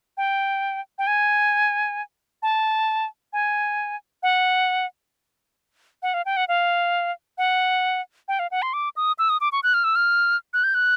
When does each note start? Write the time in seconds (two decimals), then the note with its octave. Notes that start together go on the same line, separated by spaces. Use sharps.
0.17 G5
0.98 G5
1.07 G#5
2.43 A5
3.33 G#5
4.23 F#5
6.03 F#5
6.14 F5
6.26 G5
6.37 F#5
6.48 F5
7.38 F#5
8.28 G5
8.39 F5
8.51 F#5
8.62 C6
8.73 D6
8.96 D#6
9.19 E6
9.29 D#6
9.41 D6
9.52 C#6
9.63 F#6
9.74 F6
9.84 E6
9.96 F6
10.54 F#6
10.64 G6
10.74 F#6